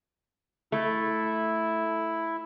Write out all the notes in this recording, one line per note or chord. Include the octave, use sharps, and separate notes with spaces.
A3 E4